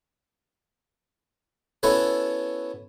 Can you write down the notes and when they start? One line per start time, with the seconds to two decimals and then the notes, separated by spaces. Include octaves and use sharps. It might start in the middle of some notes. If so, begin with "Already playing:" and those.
1.83 B3 C#4 E4 F#4 A4 C#5